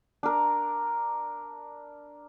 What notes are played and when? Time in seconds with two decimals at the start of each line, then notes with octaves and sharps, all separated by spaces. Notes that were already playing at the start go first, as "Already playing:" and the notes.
0.23 D4 A#4